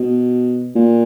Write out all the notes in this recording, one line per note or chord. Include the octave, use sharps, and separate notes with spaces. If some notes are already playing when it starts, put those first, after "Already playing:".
Already playing: B2
A#2